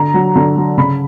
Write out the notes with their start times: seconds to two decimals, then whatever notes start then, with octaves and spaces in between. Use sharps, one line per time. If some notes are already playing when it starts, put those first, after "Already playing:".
Already playing: D3 A#5
0.14 F#3
0.35 D3
0.56 F#3
0.77 C#3 B5